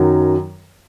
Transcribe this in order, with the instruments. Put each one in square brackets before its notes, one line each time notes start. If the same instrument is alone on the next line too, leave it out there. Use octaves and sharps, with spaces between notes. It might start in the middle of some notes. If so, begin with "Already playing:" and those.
Already playing: [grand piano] F#2 D#3 F#3